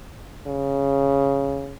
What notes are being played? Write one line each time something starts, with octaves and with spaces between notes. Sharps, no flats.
C#3